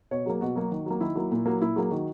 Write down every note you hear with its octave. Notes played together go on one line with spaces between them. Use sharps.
B2 C#5
F#3 A#3 G#4
B2 F#4
F#3 A#3
D#3
F#3 A#3
D#3 E4
F#3 A#3
A#2
F#3 A#3
A#2 E4
F#3 A#3 G#4
D#3 F#4